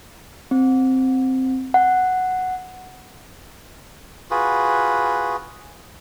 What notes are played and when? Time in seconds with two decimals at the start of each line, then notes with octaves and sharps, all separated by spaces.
0.51 C4
1.74 F#5
4.31 F4 F#4 G#4 B4